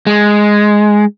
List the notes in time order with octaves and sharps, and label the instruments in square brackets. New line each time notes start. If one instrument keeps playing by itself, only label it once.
[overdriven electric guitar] G#3